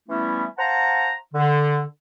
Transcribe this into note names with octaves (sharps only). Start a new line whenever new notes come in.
E3 G3 A3 B3 C#4 E4
C5 F5 F#5 A5 A#5
D3